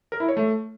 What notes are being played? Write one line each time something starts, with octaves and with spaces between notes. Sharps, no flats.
A#4
E4
C#5
A3